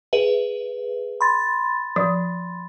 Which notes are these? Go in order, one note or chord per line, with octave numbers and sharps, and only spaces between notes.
G#4 B4 E5
B5 C6 A6
F3